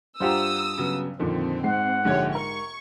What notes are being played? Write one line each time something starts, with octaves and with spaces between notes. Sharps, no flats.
G2 F4 G4 C5 F#5 A#5 D#6 E6
C#3 F#3 B3
F2 A#2 D3 D#3 C4
G#2 F#5 C7
A#1 G#2 D3 G4 C#5 G#6
A#4 C#6